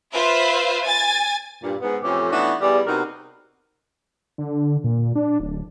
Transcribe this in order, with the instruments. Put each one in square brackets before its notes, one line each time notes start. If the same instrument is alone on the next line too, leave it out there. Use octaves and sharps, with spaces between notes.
[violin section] F4 B4 C5 E5
G#5 A6
[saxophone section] G2 A#2
G#2 B3
F2 A2 E3 C#4 G4
E3 A3 B3 D4 D#4 F#4
E2 G3
C3 B3 D#4 F#4 A#4
[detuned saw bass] D3
A#2
D4
D1